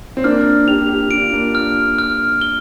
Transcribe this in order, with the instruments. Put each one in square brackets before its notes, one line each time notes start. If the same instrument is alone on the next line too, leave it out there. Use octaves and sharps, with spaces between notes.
[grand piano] C4
[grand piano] A#3 D4 [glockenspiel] F6
[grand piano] D4 G4 [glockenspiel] F7
[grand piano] D4 G4
[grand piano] D4 [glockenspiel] D7
[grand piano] F4
A#3 D4
[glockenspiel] F6
F6
G7